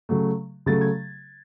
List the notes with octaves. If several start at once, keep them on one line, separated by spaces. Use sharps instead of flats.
C#3 F#3 A3
C#3 F#3 A3 A6
G#6